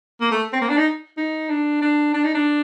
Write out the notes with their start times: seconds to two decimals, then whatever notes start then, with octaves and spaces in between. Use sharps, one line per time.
0.20 A#3
0.31 A3
0.53 C4
0.61 A#3
0.69 D4
0.77 D#4
1.17 D#4
1.49 D4
1.81 D4
2.14 D4
2.24 D#4
2.35 D4